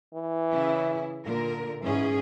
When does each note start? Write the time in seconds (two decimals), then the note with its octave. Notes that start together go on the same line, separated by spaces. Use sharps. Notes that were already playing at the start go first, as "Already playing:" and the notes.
0.14 E3
0.51 C#3 E4
1.24 A#2 D3 A#4
1.81 G#2 E3 C#4 G#4